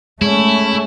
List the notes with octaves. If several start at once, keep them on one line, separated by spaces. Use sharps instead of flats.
G#3 A3 C#4 E4